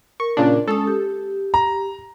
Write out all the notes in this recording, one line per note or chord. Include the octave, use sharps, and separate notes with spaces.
A#4 C#6
A#2 C#3 D4
G#3 C#4 A4 D#6
G4
A#5